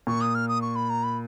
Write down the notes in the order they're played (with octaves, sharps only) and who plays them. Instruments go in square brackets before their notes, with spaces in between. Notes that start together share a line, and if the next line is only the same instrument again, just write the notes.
[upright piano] A#2 [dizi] C#6
[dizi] D#6
F6
D#6
C#6
B5
A#5
B5